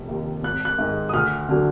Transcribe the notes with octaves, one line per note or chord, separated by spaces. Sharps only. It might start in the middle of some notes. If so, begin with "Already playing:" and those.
Already playing: F1
D#2 D#3
G#1 F#6
F#6
G#2 D#3 G#3
D#6
D2 F6
D3 F#3